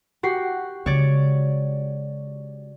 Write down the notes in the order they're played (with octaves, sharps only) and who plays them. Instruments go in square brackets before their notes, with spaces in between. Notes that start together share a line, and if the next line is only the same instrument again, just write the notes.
[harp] F#4 G4 C7
[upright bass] C#3 G#3 [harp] C#5 D5